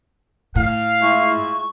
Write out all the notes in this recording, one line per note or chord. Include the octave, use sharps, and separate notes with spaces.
A2 F5
G#3 E4 F4 C#6